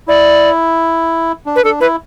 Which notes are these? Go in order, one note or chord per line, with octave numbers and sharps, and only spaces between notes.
E4 D5
D4
B4
D4 A4
E4 B4